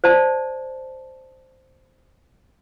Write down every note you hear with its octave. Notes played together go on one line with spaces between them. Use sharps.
C5 D5 A5